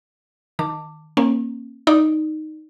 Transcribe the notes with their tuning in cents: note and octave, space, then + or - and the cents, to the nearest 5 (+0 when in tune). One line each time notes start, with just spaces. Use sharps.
D#3 +0 A5 +25 D6 +0
A#3 +0 C#4 -35
D#4 +0 D5 +0